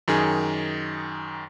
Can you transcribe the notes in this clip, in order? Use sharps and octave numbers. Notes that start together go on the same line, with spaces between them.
F#2 D#3 G#4